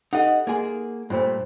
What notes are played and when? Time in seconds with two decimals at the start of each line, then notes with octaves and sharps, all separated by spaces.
0.13 D#4 G4 A4 D#5 E5 F#5
0.47 A#3 D#4 G#4 C6
1.10 G2 A#2 A3 F4 C5